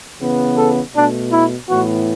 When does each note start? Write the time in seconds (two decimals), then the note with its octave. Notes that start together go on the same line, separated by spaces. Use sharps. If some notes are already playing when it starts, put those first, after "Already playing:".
0.20 C#3 E3 B3
0.58 A4
0.95 B2 A3 D4
1.32 E4
1.69 A2 E3 B3 F#4